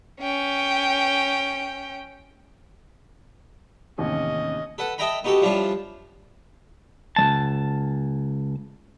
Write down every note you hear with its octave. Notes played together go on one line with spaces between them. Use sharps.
C#4 G5
A1 D#2 C3 C#4 D#5
A4 B4 F#5
A4 D#5 E5 G5 A#5 B5
B3 D#4 F#4 G4 A4
F3 G3 C#4 D4 E4 F4
C#2 G#3 A5